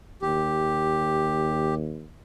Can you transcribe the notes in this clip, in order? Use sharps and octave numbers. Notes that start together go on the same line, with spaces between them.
D#2 G4